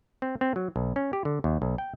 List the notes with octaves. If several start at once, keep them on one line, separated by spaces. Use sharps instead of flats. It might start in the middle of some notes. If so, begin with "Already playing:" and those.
C4
C4
F#3
B1
C#4
G4
D3
D#2
B1
G5